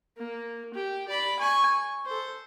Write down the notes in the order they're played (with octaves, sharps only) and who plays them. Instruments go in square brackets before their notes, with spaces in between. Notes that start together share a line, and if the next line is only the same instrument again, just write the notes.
[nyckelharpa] A#3
G4
D5 B5
G#5 C#6
C#6
A4 C5